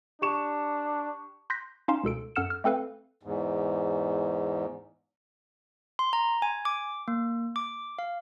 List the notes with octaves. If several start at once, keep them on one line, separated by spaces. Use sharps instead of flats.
D4 G4 C#6 E7
C6 F#6 G6 A#6 B6
C#4 D#4 F5 C6 E7
C#2 B2 A4 D7
F#2 A4 F#5 F6 C#7 E7
F6
A3 C4 A4 B4 F5
E2 G#2
C6
A#5
G#5
D6
A#3
D6
F5